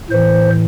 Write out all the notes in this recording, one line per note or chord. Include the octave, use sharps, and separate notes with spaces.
A2 E3 C5